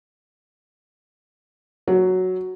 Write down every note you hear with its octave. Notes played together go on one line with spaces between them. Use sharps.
F#3